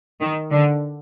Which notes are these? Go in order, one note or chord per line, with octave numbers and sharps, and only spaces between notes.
D#3
D3